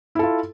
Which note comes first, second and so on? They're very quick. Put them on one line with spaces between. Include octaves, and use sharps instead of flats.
E4 A4 F4